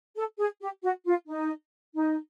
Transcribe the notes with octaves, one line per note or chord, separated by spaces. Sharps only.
A4
G#4
G4
F#4
F4
D#4
D#4